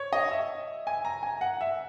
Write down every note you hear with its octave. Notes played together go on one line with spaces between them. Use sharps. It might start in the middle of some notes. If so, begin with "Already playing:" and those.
Already playing: C#5
D#5
E5
G#5
A#5
G#5
F#5
E5